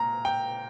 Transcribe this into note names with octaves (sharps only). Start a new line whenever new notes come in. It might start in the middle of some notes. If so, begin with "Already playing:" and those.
Already playing: A#2 A#5
G5